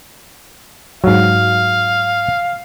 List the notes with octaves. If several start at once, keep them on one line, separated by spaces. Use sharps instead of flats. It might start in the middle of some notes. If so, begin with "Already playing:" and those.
G#2 F#3 F5